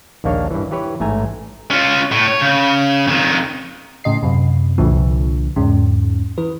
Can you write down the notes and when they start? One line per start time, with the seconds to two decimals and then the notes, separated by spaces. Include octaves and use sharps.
0.24 A#1 D#2 A#3 D4 C#5 F5
0.51 G2 E3
0.71 E3 G4 B4 C#5
1.00 A1 G#2 A3 G#5 A#5
1.71 C#4 F4
2.12 A2
2.28 C#5
2.41 C#3
3.07 F2 D#3
4.04 A2 C#3 D#5 C7
4.23 F#2 C3
4.78 C2 A#2 D3 F3
5.56 E2 G#2 C#3
6.38 E3 B4